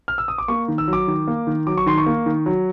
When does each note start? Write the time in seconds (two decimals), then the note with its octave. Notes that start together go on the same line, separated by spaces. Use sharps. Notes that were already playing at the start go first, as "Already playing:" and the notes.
0.08 F6
0.18 E6
0.28 D#6
0.38 D6
0.48 A#3 C#6
0.68 D#3
0.78 E6
0.88 F#3
0.93 D6
1.08 D#3
1.28 A#3
1.47 D#3
1.67 F#3 D6
1.78 C#6
1.86 D#3 C6
1.98 C#6
2.06 A#3
2.26 D#3
2.46 F#3